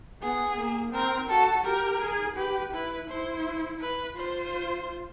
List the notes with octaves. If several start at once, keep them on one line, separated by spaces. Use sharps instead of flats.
B3 G#4
A#3
C4 A#4
F#4 A4
G4 A#4
G#4
G4 B4
E4 B4
E4 C5
B4
F4 C5